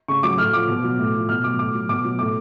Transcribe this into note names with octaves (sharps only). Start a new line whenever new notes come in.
C#3 C#6
F#3 D6
A2 F6
F3 D6
B2
F#3
A2
F3
B2 F6
F#3 D6
A2 D6
F#3
B2 D6
F#3
A2 D6